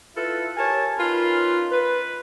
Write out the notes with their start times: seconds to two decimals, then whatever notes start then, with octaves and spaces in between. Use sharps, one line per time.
0.17 E4 F4 A4 B4 E5
0.57 G4 A#4 C#5 G#5 A5
0.98 C#4 D#4 F4 A#4 B4
1.72 B4